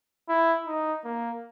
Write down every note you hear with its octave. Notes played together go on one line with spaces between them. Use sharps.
E4
D#4
A#3